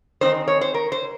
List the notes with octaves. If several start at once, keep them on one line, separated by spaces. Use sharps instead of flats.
D#3 G#3 C4 D#4 C5
C#5
C5
A#4
C5